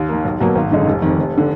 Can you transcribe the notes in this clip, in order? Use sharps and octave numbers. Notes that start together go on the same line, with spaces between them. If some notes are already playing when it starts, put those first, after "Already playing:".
Already playing: D#2
D#3 A#3
B1
B2 F#3 A#3
G#1
F#2 D3 G#3 D#4
F1
F2 D#3
F1
D3